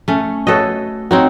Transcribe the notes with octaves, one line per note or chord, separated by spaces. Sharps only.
A3 C#4
F#4 A4 B4 C#5 D#5
C4 D#4 F#4 C#5